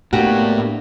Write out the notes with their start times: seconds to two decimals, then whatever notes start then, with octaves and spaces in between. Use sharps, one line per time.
0.13 A2 A#3 B3 D4 F#4 G4